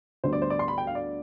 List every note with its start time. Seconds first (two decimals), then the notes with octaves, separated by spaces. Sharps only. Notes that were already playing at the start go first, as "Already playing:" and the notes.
0.24 D2 D3 G3 B3 C5
0.33 D5
0.42 C5
0.50 D5
0.59 C6
0.68 B5
0.78 G5
0.87 F5
0.95 D5